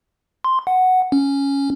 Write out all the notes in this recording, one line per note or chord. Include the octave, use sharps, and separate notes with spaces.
C6
F#5
C#4